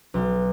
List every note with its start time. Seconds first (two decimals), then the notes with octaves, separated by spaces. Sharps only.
0.14 B1